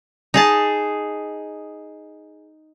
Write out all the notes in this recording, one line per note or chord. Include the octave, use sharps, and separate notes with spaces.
D#4 G#4 A5